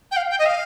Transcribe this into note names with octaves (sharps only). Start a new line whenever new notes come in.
G5
F5
G5
D#5
F5